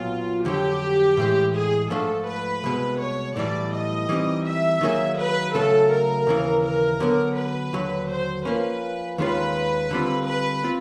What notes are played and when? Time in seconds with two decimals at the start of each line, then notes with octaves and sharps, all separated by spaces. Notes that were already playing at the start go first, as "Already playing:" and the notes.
Already playing: B1 A#2 F#3 B3 F4
0.45 F2 D3 F#3 G4
1.17 A2 E3 G#3
1.55 G#4
1.90 G#2 F3 A3 D4 A4
2.27 B4
2.64 C2 B2 G#3
3.00 C#5
3.36 B1 A2 E3 G3 D5
3.73 D#5
4.09 E3 G3 C4 D#4
4.45 E5
4.81 D#3 F#3 A#3 D#4 G#4
5.18 B4
5.54 C#3 F#3 A3 A4
5.91 A#4
6.27 D#2 C#3 E3
6.63 A#4
7.00 D3 F#3 B3
7.37 B4
7.73 D#2 D3 F#3
8.09 C5
8.45 F3 A#3 C#4 B4
9.18 D#2 D#3 G#3 C#4 F4 B4
9.91 D3 G3 C4 F4
10.27 B4
10.64 C4 F4